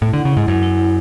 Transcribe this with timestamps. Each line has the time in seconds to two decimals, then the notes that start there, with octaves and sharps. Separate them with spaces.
0.02 A2 E4
0.13 D3
0.18 F#5
0.25 C#3
0.32 G#2 E4
0.48 F#2 E4
0.63 E4
0.78 E4